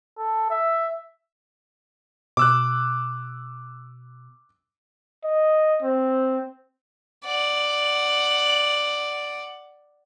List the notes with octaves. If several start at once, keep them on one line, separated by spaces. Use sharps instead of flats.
A4
E5
B2 D6 E6 F#6
D#5
C4
D5 F#5